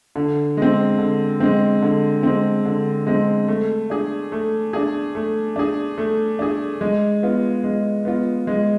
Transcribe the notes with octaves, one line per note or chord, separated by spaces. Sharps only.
D3
G#3 C4
D3
G#3 C4
D3
G#3 C4
D3
G#3 C4
A3
D4 G#4
A3
D4 G#4
A3
D4 G#4
A3
D4 G#4
G#3
B3 F4
G#3
B3 F4
G#3